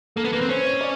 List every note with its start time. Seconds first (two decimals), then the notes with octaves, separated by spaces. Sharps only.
0.16 A#3 A4
0.25 B3
0.32 A#3 B4
0.41 C4
0.49 C#4 C5
0.65 C#5
0.81 D5